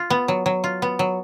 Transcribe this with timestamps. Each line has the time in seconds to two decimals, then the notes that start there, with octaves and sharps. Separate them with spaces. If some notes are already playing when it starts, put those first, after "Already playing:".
Already playing: F4
0.10 B3
0.28 F#3
0.46 F#3
0.64 F4
0.82 B3
0.99 F#3